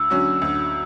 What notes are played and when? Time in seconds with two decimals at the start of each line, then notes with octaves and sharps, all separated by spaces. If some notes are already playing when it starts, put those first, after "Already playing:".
Already playing: D2 E6
0.10 D3 F#3 C#4 F#4
0.42 D2